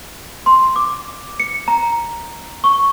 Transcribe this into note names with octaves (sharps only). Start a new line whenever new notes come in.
C6
D6
C#7
A#5
C#6